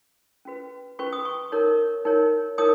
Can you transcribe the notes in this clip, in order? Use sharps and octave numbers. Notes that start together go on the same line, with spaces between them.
C#4 F#4 B4
C#4 F#4 B4 C#6
D#6
C#6
D#4 A#4 C#5
D#4 A#4 C#5
D#4 A#4 C#5 D#6